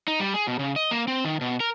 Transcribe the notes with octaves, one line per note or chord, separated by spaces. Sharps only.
D#4
G3
G#4
B2
C#3
D#5
A#3
C4
D#3
B2
A#4